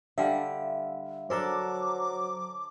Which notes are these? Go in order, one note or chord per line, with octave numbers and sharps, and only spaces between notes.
D3 G3 E5 F5
F#3 D4 A4 A#4 C5 A#5 D6